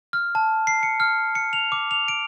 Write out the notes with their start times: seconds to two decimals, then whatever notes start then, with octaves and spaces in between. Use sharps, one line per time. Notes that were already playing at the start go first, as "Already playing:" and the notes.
0.13 F6
0.35 A5
0.67 C7
0.83 C#7
1.00 F6
1.35 C#7
1.53 F7
1.72 D6
1.91 F7
2.08 D7